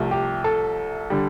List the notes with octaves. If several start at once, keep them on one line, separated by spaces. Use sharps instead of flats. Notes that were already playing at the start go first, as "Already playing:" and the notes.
Already playing: C2 C3 F3 A3
G4
A4
D3 G3